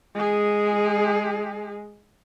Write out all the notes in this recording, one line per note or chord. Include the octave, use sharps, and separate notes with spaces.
G#3 G#4